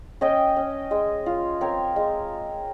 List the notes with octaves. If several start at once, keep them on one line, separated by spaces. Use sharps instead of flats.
C#4 D#5 G5
C#4
G#3
F4
C4 A#4 C#5
G#3